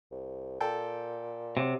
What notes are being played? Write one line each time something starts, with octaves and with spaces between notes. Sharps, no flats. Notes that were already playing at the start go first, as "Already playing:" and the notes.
C2
A#2 A4 G5
C3 F#3